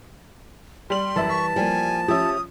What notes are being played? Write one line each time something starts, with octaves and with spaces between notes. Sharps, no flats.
G3 C6 F#7
F#2 E3 G3 E5 A5
C#6 B6
F3 G3 A#3 G#5
F3 C#4 G4 E5 D#6